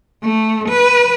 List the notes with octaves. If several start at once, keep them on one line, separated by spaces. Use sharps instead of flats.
A3
B4